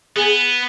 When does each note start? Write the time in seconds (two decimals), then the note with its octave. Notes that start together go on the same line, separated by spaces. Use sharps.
0.16 B3 G#4